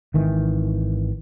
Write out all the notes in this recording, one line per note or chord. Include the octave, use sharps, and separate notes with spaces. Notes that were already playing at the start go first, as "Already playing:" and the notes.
G#1 D#3 E3